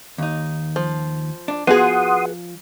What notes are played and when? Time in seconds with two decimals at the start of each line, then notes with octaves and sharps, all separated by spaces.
0.18 D#2 D#4
0.76 F3
1.48 D4
1.67 F3 B3 F#4 G#4 F#5 C6 D#6